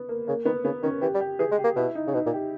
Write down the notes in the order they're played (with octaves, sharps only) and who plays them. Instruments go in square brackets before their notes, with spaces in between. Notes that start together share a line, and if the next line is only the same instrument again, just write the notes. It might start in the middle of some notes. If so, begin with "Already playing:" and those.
Already playing: [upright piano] B3
A#3
[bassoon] C#3 [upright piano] A#3
[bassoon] D#3 [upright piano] B3
[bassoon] C#3 [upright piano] B3
[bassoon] D#3 [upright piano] C#4
[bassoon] E3 [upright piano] G4
[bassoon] G3
[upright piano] G4
[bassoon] E3 [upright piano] G#4
[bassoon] G#3
[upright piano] G4
[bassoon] A#3
[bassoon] B2 [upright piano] E4
[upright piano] D#4
[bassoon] C#3
[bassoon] B2 [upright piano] D#4
[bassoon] A#2
[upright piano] G4